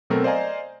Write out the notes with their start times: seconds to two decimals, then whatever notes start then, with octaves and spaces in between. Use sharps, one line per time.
0.10 B2 F#3 A3 C4 A4 A#4
0.24 C5 D5 D#5 F5 G#5 A#5